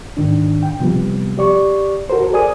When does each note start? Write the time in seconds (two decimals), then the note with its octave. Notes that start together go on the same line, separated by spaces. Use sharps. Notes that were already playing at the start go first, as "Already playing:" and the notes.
0.17 G#2 D#3 D4
0.63 G5
0.80 C3 F3 G3 B3
1.38 G4 D5 C#6
2.10 F#4 A4 A#4 C5
2.32 G#4 A#4 D5 G#5 D#6